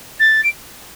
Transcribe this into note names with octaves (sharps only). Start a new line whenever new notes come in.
A6
D7